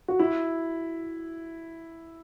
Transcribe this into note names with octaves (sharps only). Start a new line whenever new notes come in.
F#4
E4